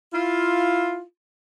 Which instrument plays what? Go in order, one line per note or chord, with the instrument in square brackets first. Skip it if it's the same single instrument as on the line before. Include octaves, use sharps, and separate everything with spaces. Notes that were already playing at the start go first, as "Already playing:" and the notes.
[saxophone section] E4 F4